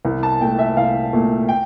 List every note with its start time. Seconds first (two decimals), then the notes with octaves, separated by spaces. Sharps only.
0.05 C2
0.23 A5
0.40 A#2 A3 G5
0.59 E5
0.77 C2 F5
1.13 A#2 A3
1.49 G5